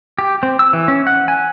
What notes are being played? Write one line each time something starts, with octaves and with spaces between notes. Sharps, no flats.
G4
C4
E6
E3
C#4
F#5
G#5